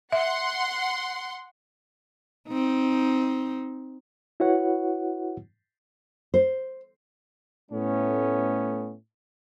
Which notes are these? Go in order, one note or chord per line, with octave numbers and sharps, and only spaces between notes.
E5 F#5 C6
C4 D#4
E4 F#4 B4 C#5 F#5
C5
A2 A3 B3 C#4